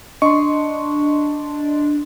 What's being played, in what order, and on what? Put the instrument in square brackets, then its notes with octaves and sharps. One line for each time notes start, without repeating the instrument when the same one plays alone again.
[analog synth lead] D4 [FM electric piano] D#5 C6 [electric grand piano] C#6